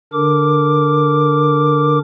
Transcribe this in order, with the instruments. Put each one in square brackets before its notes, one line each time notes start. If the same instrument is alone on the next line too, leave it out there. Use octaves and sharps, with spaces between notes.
[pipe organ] D3 D4 A#4 D6